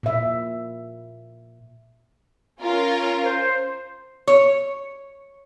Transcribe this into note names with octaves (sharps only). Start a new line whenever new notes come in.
A#2 E5
C#4 F4 A#4
C5
C#5